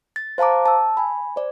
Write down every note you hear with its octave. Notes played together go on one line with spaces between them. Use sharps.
A6
C5 F5 A5 A#5 D6
A5 E6
G#5 B5
C5 D5